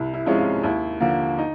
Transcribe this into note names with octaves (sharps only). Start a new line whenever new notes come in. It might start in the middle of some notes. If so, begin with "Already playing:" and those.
Already playing: C2 E4
E4
C3 F3 G#3 C#4 E4
F4
D#2 E4
D3 F3 A#3
D#4